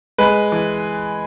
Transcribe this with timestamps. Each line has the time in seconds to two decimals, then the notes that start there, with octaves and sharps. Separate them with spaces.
0.18 G#3 B4
0.52 E3